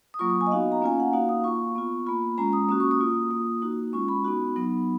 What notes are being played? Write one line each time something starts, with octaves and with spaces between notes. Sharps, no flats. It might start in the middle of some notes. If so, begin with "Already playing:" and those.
D#6
F#3 A#3 F4 C#6
D#6
G#5
D#5
B3 D#4 F#4 F5
A#5
A#3 C#4 F4 G#5
F#5
A#3 D#4 F#4 F5
D#6
A#3 F4 C#6
B3 F4
A#3 F4 B5
G#3 C#4 F4 A#5
D#6
A#3 C#4 F#4 D#6
C#6
D#6
A#3 F4
A#3 F4
A#3 D#4 F#4
G#3 C#4 F4 C#6
B5
B3 D#4 F#4
F#3 B3 D#4